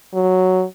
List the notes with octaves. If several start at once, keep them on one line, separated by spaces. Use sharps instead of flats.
F#3